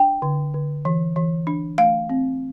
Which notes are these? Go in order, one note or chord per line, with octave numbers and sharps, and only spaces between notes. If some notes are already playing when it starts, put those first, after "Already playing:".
Already playing: D4 G5
D3
D3
E3
E3
D4
A3 F5
C4